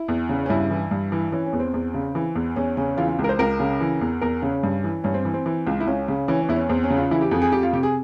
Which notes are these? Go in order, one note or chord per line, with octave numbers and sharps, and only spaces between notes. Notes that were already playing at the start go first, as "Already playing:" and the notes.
Already playing: E4
E2
C#3
C#4
G2 E4
E3
G2
E3
E3 C#4
C#4
E2
C4
E2
C#3
E3
E2
E2 C#4
C#3 C#4
E3 F4
F4
C#2
A#4
C5
C#2 A#4
C#3
E3
E2
E2 A#4
C#3 C#4
G2
E3
G2 C#4
C4
E3
C4
E3
C#2
E4
C#2 C#4
C#3
E3 C#4
C#4
E2 E4
C#4
E2 C4
C#4
C#3
F4
E3 E4
G4
F2 G#4
G#4
F2 G4
F4
C3 G4
G#4